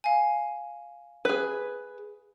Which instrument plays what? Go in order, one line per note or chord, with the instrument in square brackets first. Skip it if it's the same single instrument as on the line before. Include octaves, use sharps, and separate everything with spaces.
[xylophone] F5 G#5
[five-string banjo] G#4 B4